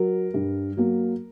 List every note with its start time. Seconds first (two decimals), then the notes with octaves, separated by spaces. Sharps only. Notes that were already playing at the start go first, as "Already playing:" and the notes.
Already playing: F#3 A#4
0.34 G2
0.77 F#3 A#3